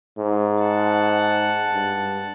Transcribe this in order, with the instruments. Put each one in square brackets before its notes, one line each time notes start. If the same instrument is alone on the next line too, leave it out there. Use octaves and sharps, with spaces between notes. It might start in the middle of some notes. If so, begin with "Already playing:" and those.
[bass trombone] G#2
[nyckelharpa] F#5 A5
[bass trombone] G2